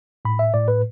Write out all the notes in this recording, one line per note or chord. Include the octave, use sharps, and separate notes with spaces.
A2 B5
E5
A2 D5
B4